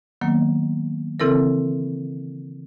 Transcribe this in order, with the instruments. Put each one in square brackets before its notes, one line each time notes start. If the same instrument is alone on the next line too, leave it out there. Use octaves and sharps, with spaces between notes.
[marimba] D#3 F#3 A#3 B3
C#3 E3 C4 E4 A4 A#4